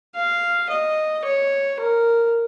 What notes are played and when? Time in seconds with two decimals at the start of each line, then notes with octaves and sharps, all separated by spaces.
0.15 F5
0.70 D#5
1.25 C#5
1.79 A#4